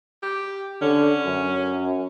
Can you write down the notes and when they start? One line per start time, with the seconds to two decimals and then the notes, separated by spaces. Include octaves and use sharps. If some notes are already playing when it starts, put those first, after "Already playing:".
0.22 G4
0.82 D3 C#4
1.26 F#2